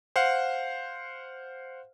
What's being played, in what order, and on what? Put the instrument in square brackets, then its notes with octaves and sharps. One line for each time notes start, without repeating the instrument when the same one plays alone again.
[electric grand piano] C5 F5 F#5